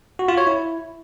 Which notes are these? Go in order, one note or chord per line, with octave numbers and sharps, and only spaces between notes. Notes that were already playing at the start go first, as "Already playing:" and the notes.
F#4
F4
C#5
E4